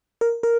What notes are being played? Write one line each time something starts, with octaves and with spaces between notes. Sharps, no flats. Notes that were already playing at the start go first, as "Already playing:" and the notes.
A#4
A#4